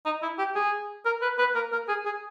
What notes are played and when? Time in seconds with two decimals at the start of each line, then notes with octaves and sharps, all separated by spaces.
0.05 D#4
0.22 E4
0.39 G4
0.55 G#4
1.06 A#4
1.22 B4
1.39 B4
1.55 A#4
1.72 A#4
1.89 G#4
2.05 G#4